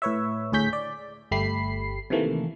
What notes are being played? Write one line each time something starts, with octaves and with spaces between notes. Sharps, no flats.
A2 B4 C#5 E5
D2 A2 G#4 C#5 G6 B6
D5
G1 A3 G4 B5 C7
C3 D#3 E3 A3 A#3